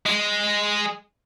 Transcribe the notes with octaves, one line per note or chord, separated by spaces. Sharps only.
G#3